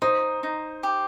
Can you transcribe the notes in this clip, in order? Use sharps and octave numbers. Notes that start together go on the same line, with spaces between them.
D#4 C5
D#4
G4